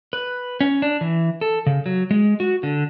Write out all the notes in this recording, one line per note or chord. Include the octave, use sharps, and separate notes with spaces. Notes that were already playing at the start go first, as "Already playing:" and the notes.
B4
C#4
D4
E3
A4
C#3
F#3
G#3
F#4
D3